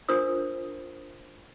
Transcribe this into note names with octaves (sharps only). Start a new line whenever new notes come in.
D4 F4 A#4 C5 D#6